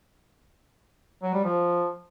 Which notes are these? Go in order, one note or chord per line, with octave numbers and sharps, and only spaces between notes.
F#3
G3
F3